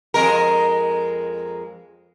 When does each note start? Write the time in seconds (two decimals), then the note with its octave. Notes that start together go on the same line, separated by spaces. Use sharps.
0.14 F2 G#3 A#4